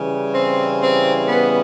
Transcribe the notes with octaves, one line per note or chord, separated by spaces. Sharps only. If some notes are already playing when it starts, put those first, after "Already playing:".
Already playing: C#3 E3 G3
C4
C4
B3